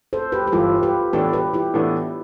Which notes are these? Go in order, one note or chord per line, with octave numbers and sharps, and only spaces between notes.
A4 C5
G4 B4
G4
G1 G2 E3 F4 A4
G4 B4
A2 E3 B3 D4 G4 A4 B4
G4 B4
E4 G4
A2 E3 B3 D4 A4